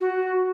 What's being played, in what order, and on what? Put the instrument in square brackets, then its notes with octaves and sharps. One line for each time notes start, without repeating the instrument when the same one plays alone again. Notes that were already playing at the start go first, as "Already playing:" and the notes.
[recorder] F#4